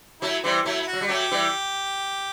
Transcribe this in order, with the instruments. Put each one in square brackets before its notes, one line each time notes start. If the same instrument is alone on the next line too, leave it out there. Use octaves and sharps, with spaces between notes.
[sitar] F#3 A3 [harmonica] E4
[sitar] E3 G3 [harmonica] C4
[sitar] F#3 A3 [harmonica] E4
[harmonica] E4
F#4
[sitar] F#3
G3
[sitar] F#3 A3 [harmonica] G4
[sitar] E3 G3